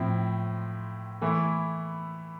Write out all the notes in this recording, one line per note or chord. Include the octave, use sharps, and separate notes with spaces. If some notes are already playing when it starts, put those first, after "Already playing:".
Already playing: A2 F3 C4 E4
E3 A3 E4